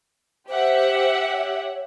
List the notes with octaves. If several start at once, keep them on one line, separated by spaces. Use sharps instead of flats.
G4 C5 E5 F#5
C#5